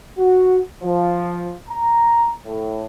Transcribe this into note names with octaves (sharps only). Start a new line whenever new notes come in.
F#4
F3
A#5
A2